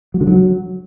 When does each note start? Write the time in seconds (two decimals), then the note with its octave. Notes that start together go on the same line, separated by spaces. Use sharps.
0.14 F#3
0.21 D3
0.27 F#3